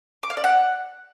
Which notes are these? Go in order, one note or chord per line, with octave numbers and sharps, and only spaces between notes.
D6
F5
D5
F#5